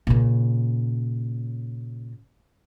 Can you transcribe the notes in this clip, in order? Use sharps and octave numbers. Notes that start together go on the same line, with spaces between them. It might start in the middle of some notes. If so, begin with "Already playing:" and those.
A#2 C#3